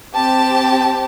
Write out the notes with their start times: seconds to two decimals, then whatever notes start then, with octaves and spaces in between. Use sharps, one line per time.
0.14 C4 G4 A5